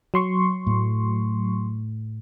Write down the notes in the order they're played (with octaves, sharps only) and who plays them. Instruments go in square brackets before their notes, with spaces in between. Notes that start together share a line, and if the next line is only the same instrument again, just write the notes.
[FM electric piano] F#3 C6 C#6
[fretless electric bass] A2 A3